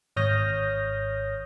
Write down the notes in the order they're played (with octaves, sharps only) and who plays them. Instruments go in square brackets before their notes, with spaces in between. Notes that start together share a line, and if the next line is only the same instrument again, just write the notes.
[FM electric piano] G#1 C#5 D#6 F6 G6 A#6